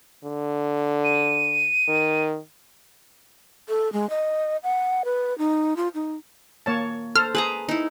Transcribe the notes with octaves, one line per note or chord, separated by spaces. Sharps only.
D3
D#7
D#3
A4
G#3
D#5
F#5
B4
D#4
F4
D#4
A#3 C#5 A5
A4 C5 F6
G#4 B4 A5 A#5
D#4 E4